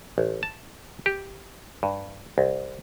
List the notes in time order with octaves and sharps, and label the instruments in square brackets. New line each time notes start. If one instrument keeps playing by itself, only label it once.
[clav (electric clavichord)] A1
A5
G4
G2
C2